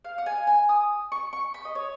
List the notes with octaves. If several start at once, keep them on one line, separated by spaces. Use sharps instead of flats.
F5
F#5
G#5
G#5
D#6
C#6
C#6
B5
D#5
C#5